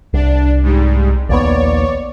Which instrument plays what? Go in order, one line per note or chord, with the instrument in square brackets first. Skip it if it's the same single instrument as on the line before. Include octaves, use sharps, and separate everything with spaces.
[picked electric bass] C2 [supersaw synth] D4
[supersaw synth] G#2 G3
[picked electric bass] A#1 D#2 B3 [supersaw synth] C#5 D5